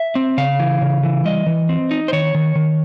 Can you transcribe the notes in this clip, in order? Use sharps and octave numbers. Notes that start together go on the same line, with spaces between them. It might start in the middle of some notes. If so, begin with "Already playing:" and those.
Already playing: E5
C4
C#3 F5
E3
C#3
E3
G3 D#5
E3
C4
D#4
C5
D#3 C#5
D#3
D#3